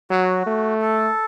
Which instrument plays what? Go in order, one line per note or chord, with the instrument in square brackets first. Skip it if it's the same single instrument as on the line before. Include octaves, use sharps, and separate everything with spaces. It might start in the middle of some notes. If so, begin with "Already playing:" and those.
[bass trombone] F#3 [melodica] F#4
[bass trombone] A3
[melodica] A4